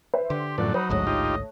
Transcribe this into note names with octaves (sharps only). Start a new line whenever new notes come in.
B4 C5 E5
D3 G4 C6
F#2 A2 F3 D5 F#6
F#3 D#4 C5 B5
A1 D2 G#2 A3 C#5 D#5
D#4 F4 G4